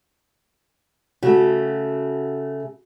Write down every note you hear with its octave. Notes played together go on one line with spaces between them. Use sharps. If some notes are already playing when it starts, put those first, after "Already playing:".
C#3 A3 F#4